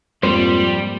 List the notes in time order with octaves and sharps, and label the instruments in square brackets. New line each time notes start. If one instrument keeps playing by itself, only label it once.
[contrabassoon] F2 [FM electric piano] G#2 A#3 [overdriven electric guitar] G3 [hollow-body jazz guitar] C5